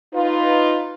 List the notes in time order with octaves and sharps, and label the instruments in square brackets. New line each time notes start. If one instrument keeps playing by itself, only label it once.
[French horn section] D#4 F4 B4